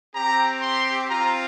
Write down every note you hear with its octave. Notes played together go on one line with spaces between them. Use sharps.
C4 G4 A#5
C6
C4 F4 A#5